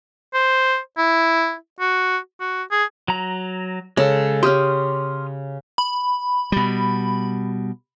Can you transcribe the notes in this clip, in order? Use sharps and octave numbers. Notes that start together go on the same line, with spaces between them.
C5
E4
F#4
F#4
G#4
F#3 A#5
C#3 G#3 A4
C#4 G4 C6 D#6 F6
B5
B2 G3